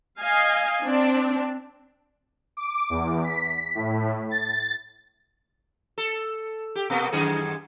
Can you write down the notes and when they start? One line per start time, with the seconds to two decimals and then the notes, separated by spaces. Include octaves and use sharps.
0.19 D#5 F5 G#5
0.83 C4 D4
2.57 D6
2.90 E2
3.24 B6
3.75 A2
4.31 A6
5.98 A4
6.75 G4
6.90 B2 A#3 B3
7.12 F#2 D#3 G#4